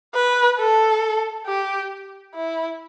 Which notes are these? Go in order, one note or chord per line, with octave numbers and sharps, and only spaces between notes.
B4
A4
G4
E4